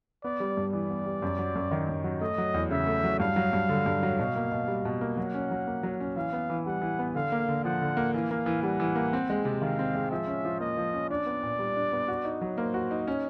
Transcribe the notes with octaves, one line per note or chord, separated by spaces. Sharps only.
B3 D5
G3
G2
E3 D5
B3
G3
F#2
F#3
F#2
D#3
F#2
F#3
A3 D#5
F#3
E2
C#3 E5
A3
F#3
G2 F5
F#3
G2
D3
G2
F#3
B2
A#3
B2
G3
B2
A#3
F#3 F#5
C#4
F#3
A#3
F#3
C#4
E3 F5
B3
E3
G3 F#5
E3
B3
D3 F5
A#3
D3
F3 F#5
D3
A#3
E3 F5
A#3
E3
G3 F#5
E3
A#3
C4
G#3
C3
D#3 F5
C4
G#3
F3 E5
C#4
F3
A#3 D#5
F3
C#4
D4 D5
B3
A#2
G3
D4
B3
F#4
D#4
F#3
A#3 C5
F#4
D#4
C#4